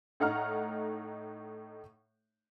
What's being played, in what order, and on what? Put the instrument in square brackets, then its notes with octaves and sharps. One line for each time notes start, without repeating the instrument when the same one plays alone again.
[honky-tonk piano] A2 A3 D#4 F#5 A#5 F6